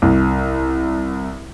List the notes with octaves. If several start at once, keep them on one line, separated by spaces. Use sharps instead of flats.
C2